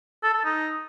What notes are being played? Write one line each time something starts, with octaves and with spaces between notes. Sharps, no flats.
A4
A4
D#4